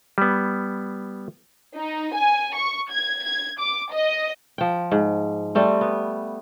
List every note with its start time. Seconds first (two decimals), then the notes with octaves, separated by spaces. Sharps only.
0.18 G3 B3
1.76 D#4
2.14 G#5
2.55 C#6
2.92 G#6
3.24 G#6
3.59 D6
3.92 D#5
4.58 F3 G5
4.92 G#2
5.55 G3 A3 C4
5.81 B3